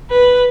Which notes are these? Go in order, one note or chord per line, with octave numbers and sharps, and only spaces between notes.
B4